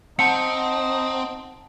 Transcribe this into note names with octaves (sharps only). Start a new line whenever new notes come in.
C4 D#4 F#5 A5 C#7